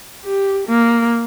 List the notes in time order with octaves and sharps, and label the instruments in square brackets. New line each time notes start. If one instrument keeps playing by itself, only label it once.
[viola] G4
A#3